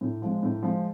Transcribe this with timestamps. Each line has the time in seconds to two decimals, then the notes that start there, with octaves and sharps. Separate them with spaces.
0.01 A2
0.22 F3 G#3
0.43 A2
0.63 F3 G#3